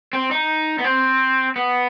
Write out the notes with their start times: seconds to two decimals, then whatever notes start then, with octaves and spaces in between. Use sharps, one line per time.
0.13 C4
0.31 D#4
0.79 B3
0.84 C4
1.56 B3